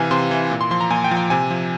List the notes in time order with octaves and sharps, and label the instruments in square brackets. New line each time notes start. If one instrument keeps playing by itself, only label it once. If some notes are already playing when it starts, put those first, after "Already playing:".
Already playing: [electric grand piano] C3 E3 F5 G#5
C3 C6
E3
A#2
C6
F3 C6
A#5
A#2 G#5
G5
F3
G5
C3 G#5
F3